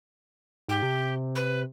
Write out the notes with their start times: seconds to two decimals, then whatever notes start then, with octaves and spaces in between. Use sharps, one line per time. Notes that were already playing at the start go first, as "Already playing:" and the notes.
0.68 G#2 G4
0.83 C3
1.35 B4